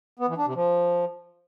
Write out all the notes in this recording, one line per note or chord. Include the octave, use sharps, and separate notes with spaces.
B3
E3
D4
C3
F3